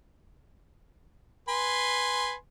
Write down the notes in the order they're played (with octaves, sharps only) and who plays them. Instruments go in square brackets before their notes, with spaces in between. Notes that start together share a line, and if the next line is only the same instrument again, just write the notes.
[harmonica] B4 G#5 C6